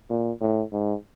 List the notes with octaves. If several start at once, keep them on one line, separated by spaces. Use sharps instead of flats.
A#2
A2
G#2